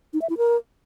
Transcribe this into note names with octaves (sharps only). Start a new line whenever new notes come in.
D#4
E5
E4
A#4